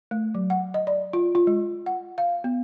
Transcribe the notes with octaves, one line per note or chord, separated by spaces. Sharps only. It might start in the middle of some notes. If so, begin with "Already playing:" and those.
A3
F#3
F#5
D#5
D5
F4
F4
G#3
F#5
F5
B3